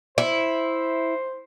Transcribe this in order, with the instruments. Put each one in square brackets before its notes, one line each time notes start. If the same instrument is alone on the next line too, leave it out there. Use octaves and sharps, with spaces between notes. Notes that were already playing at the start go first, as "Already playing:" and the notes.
[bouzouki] E4 [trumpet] C5